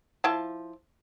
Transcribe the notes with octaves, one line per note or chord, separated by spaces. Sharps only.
F3 E4 A5